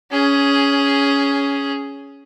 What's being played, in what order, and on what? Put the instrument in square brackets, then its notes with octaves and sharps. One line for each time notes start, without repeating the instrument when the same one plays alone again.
[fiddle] C#4 G#4